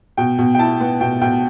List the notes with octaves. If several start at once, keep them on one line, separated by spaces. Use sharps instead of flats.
B2 G5
B2
G5
E4 A5
B3
B2 G5
B2 G5